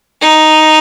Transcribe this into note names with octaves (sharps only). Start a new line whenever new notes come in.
D#4